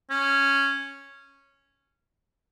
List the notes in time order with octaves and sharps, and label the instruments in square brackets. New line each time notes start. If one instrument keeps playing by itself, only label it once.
[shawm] C#4